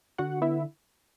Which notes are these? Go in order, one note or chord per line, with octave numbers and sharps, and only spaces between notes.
D3 F#4 F#5
B3 E4 E5